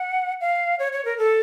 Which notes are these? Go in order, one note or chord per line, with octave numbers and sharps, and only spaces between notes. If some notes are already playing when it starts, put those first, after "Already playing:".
Already playing: F#5
F5
C#5
C#5
A#4
A4